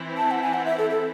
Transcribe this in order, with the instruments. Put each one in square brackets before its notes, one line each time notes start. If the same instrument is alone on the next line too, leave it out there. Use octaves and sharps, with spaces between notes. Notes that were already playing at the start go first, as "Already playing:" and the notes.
Already playing: [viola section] E3 C4 E4
[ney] A5
F#5
G#5
F#5
E5
A4
A4